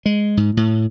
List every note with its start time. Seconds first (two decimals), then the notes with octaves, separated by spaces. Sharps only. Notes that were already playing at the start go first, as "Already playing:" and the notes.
0.06 G#3
0.37 G#2
0.57 A2